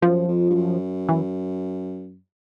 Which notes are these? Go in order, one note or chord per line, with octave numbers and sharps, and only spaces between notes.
F#2 F3
F2
G2
F#2
E3